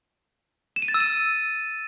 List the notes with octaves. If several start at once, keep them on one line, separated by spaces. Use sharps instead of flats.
E7
D#7
A6
E6
D#7